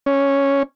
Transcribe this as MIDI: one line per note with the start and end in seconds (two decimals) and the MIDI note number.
0.06 0.63 61